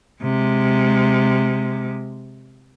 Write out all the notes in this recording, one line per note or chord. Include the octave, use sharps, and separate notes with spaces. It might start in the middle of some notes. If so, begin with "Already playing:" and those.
C3 G#3